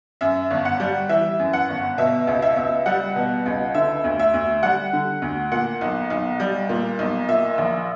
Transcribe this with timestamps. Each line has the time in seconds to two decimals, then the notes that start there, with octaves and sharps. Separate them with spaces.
0.21 F#2 E5
0.50 G1
0.65 F#5
0.80 G3
1.09 E3 E5
1.39 F#2
1.53 F#5
1.68 G1
1.98 B2 E5
2.27 C#2
2.42 E5
2.57 C#2
2.86 G3 F#5
3.16 B2
3.46 C#2
3.75 D3 E5
4.04 D2
4.19 E5
4.34 D2
4.63 G3 F#5
4.93 D3
5.22 D2
5.52 A#2 F#5
5.81 B1
6.10 B1
6.40 G3
6.69 A#2
6.99 B1
7.28 A#2 E5
7.58 A#1